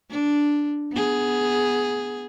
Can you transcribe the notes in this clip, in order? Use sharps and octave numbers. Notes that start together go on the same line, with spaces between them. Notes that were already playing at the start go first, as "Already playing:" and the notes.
D4
B3 G#4